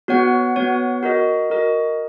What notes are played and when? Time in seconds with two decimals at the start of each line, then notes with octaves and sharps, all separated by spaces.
0.08 B3 F#4 C#5 F#5
0.56 B3 F#4 C#5 F#5
1.03 F#4 A#4 D#5
1.50 F#4 A#4 D#5